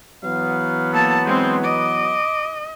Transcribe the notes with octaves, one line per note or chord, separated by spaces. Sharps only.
E3 F#3 B3 F5
A#3 A4 A5
G#3 C4 C5
D#5 D6